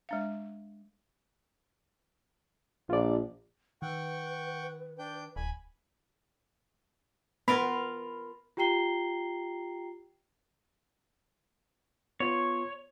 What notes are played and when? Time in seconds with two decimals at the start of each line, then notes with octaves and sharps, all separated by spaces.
0.09 G#3 D4 F5
2.90 A#1 F4 D5
3.82 D#3 B4 F#5 G5 C#6
4.99 D4 G5 G6
5.36 D1 G#5 B5
7.48 B3 F4 A#4 F5 B5
8.57 F4 G4 G5 A#5 C7 G7
12.20 B3 F4 C#5 C6